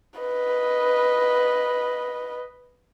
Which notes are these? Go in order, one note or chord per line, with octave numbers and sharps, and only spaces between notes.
B4 D#5